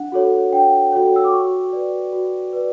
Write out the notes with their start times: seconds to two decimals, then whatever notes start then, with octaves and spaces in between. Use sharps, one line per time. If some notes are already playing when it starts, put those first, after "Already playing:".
Already playing: D4 F#5
0.12 F#4 A4 C#5
0.52 D4 G5
0.92 F#4 A4 C#5
1.16 E6
1.24 D6
1.32 F#4 C#6
1.73 B4 D5
2.13 F#4
2.53 B4 D5